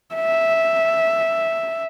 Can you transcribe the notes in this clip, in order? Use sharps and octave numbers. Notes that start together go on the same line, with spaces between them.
E5